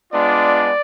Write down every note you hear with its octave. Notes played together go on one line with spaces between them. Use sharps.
G#3 B3 D4 F4 D5